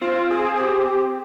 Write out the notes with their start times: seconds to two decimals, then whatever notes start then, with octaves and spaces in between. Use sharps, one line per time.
0.01 C4 F4
0.31 G#4
0.56 G#4
0.60 G4